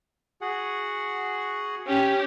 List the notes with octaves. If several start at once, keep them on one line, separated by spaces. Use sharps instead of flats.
F#4 G#4 F#5
C#4 G4